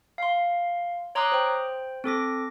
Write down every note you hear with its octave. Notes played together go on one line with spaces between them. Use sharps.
F5 C6
C#5 A#5 C6 D6 D#6 F#6
C5 G5
C4 A4 D6 A#6